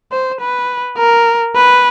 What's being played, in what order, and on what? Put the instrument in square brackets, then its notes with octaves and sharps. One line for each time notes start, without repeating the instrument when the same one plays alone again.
[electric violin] C5
B4
A#4
B4